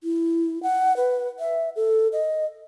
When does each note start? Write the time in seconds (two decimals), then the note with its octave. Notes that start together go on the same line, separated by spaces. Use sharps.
0.04 E4
0.63 F#5
0.97 B4
1.39 E5
1.76 A4
2.13 D#5